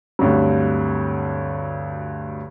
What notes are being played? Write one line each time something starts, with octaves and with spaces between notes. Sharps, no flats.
D2 G2 C3 F#3